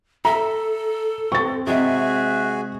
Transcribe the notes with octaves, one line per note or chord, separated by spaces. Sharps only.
A4 E5 A#5
C4 C#6 A6
C3 G#3 F#4 G#4 E5